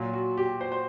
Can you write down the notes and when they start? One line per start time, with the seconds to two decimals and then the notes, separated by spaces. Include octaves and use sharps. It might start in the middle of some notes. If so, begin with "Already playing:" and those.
Already playing: A#2 F#3 F4
0.13 F#4
0.37 G4
0.61 C5
0.72 C5